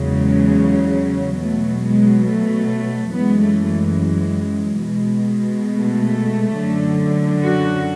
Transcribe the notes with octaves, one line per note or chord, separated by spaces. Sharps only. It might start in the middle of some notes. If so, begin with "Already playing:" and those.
Already playing: E2 C#3 F#3 G#3
B2 F#3 A3
G#3
A3
F#2 E3 G#3 B3
A3
G#3
B2 G#3
A3
F#2 D3 F#3
F#4